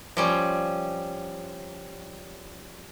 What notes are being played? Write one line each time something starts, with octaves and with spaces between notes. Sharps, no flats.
F3 G3 C#4